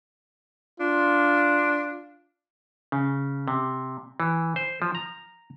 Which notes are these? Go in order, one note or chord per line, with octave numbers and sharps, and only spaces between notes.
D4 F4
C#3
C3
E3
C5
F3
A#5